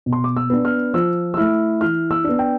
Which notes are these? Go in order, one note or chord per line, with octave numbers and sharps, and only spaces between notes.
B2
C6
D6
E6
B3 D4
F6
F3 E6
E6
A3 E4 F6
E3 F6
E6
B3 D4
G5